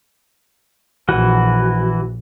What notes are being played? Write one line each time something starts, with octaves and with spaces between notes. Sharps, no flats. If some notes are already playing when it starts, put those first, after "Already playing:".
A#1 E3 F#4